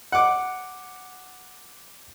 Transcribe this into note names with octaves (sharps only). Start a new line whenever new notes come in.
F#5 D6